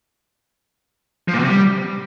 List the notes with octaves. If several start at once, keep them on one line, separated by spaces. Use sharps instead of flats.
F3
A#2
B2
C3
G3